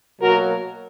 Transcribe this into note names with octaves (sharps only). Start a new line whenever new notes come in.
B2 F#3 A#3 F#4 A#4